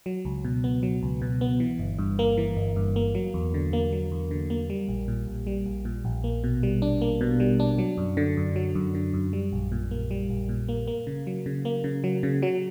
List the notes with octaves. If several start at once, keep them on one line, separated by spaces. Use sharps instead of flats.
F#3
C#2
B2
B3
F#3
C#2
B2
B3
E3
G1
G2
A#3
E3
G1
G2
A#3
F#3
E2
D3
A#3
F#3
E2
D3
A#3
G3
A#1
A#2
A#1
G3
A#1
A#2
A#1
A#3
B2
G3
D4
A#3
B2
G3
D4
F#3
F#2
D3
F#2
F#3
F#2
D3
F#2
G3
A#1
A#2
A#3
G3
A#1
A#2
A#3
A#3
C#3
F#3
C#3
A#3
C#3
F#3
C#3
F#3